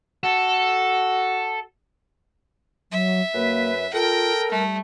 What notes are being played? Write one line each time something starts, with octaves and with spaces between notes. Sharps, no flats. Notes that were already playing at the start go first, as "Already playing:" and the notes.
F#4 A4
F#3 E5
F#2 A#3 B4
F4 A4 A#4 G5
G3 A3